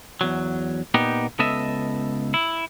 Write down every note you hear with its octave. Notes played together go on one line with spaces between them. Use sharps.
E2 F#3
A#2 B3 D#4 G4
C#2 B3 A4 D#5 E5
E4